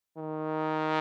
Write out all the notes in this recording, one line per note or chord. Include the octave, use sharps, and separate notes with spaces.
D#3